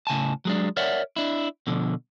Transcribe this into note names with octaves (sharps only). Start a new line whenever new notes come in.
A2 C#3 G#5 A5
F#3 G#3 D4
A#4 C#5 D5 E5 F#5
D4 E4
B2 D3 F3